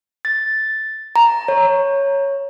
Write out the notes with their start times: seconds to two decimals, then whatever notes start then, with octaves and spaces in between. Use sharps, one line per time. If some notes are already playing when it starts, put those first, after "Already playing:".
0.25 A6
1.16 A#5
1.48 C#5